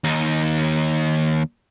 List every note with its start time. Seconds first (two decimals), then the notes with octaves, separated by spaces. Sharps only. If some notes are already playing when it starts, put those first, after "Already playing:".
0.04 D#2 D#4